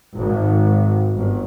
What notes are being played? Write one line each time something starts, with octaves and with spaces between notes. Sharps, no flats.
G#1
G1